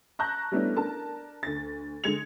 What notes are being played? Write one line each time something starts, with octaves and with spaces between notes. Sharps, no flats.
A5 A#5 C#6 F#6 G6 A#6
G3 A3 B3 C#4 D4 E4
D4 A#4 A5
D2 A6
D3 G#3 G#6 C#7 F7